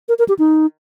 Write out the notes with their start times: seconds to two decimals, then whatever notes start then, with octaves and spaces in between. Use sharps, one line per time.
0.09 A#4
0.19 A#4
0.29 G4
0.39 D#4